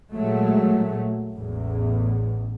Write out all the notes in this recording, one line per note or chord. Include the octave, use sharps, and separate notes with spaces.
A#2 F#3 G#3 A3
A1 E2 A2